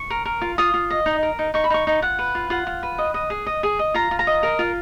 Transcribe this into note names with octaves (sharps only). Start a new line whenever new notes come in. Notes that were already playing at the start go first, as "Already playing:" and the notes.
Already playing: C#6
A#4
A#4
F4
F4 D#6
F4
D#5
D#4
A#4
D#4
D#4 C#6
B5
D#4 C#6
D#4
F4 F#5
B4
F4
F4 F#5
F4
B4
D#5
D#5
G#4
D#5
G#4
D#5
F4 A#5
F4
A#5
D#5
A#4
F4